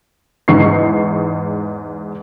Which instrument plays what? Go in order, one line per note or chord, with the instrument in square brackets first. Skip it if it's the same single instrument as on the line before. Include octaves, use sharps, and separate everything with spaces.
[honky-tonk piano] E2 G#2 C#6 C7